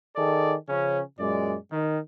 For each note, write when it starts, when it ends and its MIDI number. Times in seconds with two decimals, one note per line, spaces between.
0.16 0.53 51
0.16 0.53 68
0.16 0.53 69
0.16 0.53 74
0.68 1.00 49
0.68 1.00 53
0.68 1.00 61
1.19 1.55 42
1.19 1.55 46
1.19 1.55 56
1.19 1.55 74
1.71 1.98 51